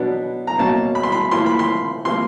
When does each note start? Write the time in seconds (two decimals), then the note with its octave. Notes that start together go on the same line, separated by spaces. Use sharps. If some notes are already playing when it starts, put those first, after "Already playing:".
Already playing: B2 F#3 B3 D4
0.47 A#5
0.58 B2 F#3 A#3 C#4 A5
0.95 B5
1.03 C6
1.12 B5
1.31 A2 F3 A#3 C6
1.46 B5
1.59 C6
2.05 C3 F3 A#3 C6